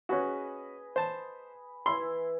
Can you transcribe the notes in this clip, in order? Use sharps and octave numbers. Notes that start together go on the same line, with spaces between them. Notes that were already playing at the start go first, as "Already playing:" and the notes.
C#4 F#4 G#4 B4 D#5
C5 A5
E3 E4 B5 C6